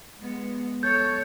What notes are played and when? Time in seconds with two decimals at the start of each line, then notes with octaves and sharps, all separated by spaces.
0.18 G#3 B3
0.83 A4 C#5 G6